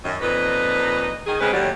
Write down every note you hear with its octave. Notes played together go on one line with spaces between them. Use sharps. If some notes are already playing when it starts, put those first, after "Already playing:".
F#2 D#3
F2 A#2 D#4 B4
D#3 G#4
D2 C#3 G#3 C4 C#4 B4
D#2 A2 F#3 G3